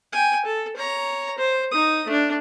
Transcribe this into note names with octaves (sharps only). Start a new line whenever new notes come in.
G5 G#5
A4
C#5 A#5
C5
D#4 D#6
A3 D4